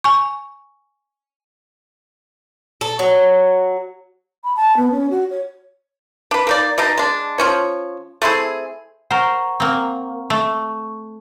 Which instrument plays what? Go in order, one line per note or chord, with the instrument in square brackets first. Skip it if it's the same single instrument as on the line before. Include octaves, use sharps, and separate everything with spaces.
[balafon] G#5 C#6
[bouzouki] A4
F#3
[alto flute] B5
A5
B3
C#4
F#4
C#5
[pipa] D4 B4
A#3 D#4 D5
B2 D4 D#4 D#5
G#3 D4
F3 C#4 C#5
A3 C4 E4 G#4
[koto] A#4 C5 [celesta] F#5 A#5 C#6
[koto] A#3 C4
[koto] A3 [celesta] C#6